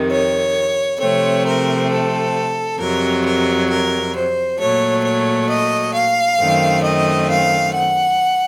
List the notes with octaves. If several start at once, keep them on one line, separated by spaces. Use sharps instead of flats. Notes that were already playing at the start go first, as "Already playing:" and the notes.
Already playing: F2 C3 D#3
C#5
C3 F3 A3 C4 C#5
A#4
A4
F2 C3 F#3 A#4
A#4
A#4
C5
A#2 F#3 A3 C#5
C#5
D#5
F5
F#2 D#3 A3 C4
D#5
F5
F#5